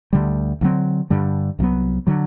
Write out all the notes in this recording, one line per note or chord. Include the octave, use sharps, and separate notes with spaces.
D2 D3 G3
D2 D3 F#3 C4
G2 D3 G3
C2 C3 F#3 B3
D3 F#3